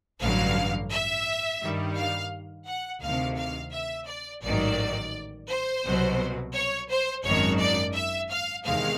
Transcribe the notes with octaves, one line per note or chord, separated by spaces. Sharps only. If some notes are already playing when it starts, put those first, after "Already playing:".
A1 G2 D3 F#3 F5
E5
G2 D#3 G3
F5
F#5
D2 C3 D#3 F5
F5
E5
D5
A1 G#2 D#3 F#3 D5
C5
C2 B2 F#3
C#5
C5
G#1 F#2 D#3 C#5
D5
E5
F5
E2 C3 D#3 G#3 F5